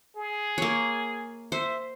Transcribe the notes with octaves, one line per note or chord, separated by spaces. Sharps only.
G#4
A#3 C#5
C5 E5